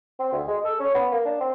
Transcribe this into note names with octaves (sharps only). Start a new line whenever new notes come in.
C4
D2
G#3
A4
C#4
B3
A#3
D4
C4